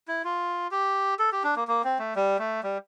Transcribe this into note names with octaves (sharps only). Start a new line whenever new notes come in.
E4
F4
G4
A4
G4
D4
A#3
A#3
C4
A3
G3
A3
G3